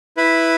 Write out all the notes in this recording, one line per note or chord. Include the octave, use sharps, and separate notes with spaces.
E4 B4